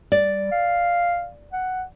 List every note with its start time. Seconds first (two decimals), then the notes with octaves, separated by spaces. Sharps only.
0.12 G3 D5
0.52 F5
1.53 F#5